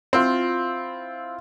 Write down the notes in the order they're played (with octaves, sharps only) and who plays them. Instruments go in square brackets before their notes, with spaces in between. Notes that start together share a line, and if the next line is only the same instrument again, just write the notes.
[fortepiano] C4 [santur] E4 F4